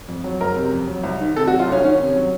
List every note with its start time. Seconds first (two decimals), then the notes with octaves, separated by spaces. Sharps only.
0.08 F2
0.24 F#3
0.40 F#1 A#4
0.56 C3
0.72 F2
0.87 F#3
1.03 C2
1.20 D#3
1.36 C3 A4
1.47 F#4
1.52 F#3
1.59 F4
1.67 C2 C#4
1.83 D#3 C#4
1.99 C3
2.16 F#3